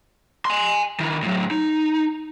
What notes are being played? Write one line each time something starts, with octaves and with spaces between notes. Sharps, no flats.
G#5 C6
D#3 E4
A2 F#3
D#4